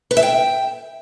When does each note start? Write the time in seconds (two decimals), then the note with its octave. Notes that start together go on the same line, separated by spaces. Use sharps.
0.11 B4
0.17 E5
0.23 G5